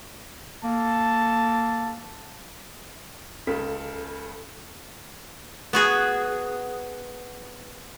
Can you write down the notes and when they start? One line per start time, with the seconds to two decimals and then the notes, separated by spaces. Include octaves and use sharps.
0.64 A#3 A4 A5
3.47 C#2 C#3 A4 B6
5.73 B3 F#4 G#4